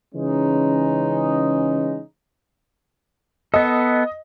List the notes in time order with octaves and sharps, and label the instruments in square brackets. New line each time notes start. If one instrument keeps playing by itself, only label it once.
[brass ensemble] C#3 E3 G#3 C#4 D#4
[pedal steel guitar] B3 A4 [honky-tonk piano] D#5